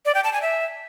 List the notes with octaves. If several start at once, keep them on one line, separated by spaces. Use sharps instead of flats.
D5
G5
A5
G#5
E5